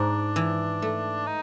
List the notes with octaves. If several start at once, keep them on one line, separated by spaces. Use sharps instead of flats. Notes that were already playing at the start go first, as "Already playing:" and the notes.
Already playing: G#2 D4
E3
A3
D#4